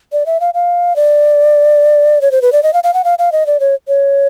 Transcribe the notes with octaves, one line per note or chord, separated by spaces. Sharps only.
D5
E5
F5
F5
D5
C#5
C5
B4
D5
D#5
F5
F5
F#5
F5
F5
D#5
D5
C#5
C#5